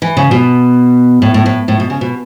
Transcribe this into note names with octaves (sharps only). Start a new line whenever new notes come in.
E3
C#3
B2
A2
A2
A2
A2
B2
C#3
B2